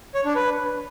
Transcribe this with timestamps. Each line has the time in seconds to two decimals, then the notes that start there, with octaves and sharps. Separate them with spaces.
0.15 C#5
0.25 D4
0.35 B4